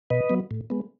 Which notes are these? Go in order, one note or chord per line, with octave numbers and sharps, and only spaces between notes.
B2 B4 D#5
F#3 B3
A2
G#3 B3